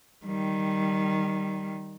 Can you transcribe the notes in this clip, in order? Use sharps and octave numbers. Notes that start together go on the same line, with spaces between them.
D#3 G3